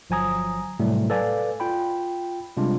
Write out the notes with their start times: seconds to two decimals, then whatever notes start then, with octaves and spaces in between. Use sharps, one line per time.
0.10 G1 F3 F#3 G#5 A#5 D#6
0.80 A2 C3 F#3 G3 A3
1.10 A4 B4 D5 F5 G#5
1.60 F4 G5 B5
2.57 C3 G3 G#3 D4 F4